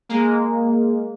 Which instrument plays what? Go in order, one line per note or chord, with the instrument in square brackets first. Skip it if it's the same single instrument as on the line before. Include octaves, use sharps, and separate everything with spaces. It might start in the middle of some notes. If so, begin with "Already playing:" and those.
[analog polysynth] G#3 A#3